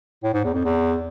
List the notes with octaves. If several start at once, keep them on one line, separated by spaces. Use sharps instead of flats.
A2
G#2
E2
F2
E2